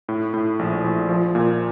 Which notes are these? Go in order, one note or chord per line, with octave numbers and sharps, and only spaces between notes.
A2
A2
A#1
A#1
F3
A#2